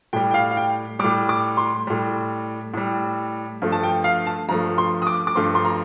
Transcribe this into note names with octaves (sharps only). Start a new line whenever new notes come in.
A2 G3 G5
G5
F5
F5
G5
A2 G3 D6
D6
C6
A2 G3
A2 G3
G2 F3 A3
A5
G5
F5
A5
G2 F3 A3 A#5
C6
D#6
D6
D6
G2 F3 A3 C6
C6
A#5